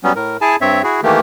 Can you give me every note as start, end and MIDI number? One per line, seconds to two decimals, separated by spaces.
0.04 0.13 54
0.04 0.13 55
0.04 0.13 59
0.04 0.13 61
0.16 0.37 45
0.16 0.37 70
0.41 0.56 64
0.41 0.56 68
0.41 0.56 80
0.41 0.56 81
0.61 0.82 43
0.61 0.82 60
0.61 0.82 73
0.61 0.82 76
0.84 1.01 64
0.84 1.01 66
0.84 1.01 68
1.03 1.20 51
1.03 1.20 52
1.03 1.20 57
1.03 1.20 58
1.03 1.20 67